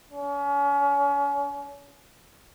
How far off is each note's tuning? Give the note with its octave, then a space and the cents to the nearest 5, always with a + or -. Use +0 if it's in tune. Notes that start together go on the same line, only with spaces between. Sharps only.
C#4 +35